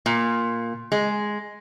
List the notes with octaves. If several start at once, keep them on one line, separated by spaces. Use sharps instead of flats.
A#2
G#3